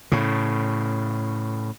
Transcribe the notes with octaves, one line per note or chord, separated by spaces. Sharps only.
A2 C#3